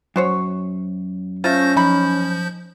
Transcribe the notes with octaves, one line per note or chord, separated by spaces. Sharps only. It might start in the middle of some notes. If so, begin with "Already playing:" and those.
F#2 F#4 C5 C#5
A3 C#4 F4 C5 G6 A#6
F3 D#4 B5 G6